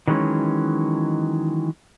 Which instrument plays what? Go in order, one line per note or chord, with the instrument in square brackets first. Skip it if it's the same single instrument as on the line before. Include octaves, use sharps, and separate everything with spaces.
[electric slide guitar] D#3 E3 F#3 G#3 C#4